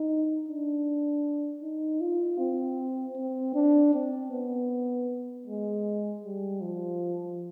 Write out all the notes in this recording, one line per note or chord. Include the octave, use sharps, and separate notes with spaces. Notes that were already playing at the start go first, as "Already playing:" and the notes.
Already playing: D#4
D4
D#4
F4
C4
C4
D4
C4
B3
G#3
G3
F3